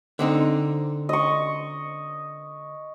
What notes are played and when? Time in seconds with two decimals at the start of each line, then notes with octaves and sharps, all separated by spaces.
0.19 D3 C4 D#4
1.09 D#5 C#6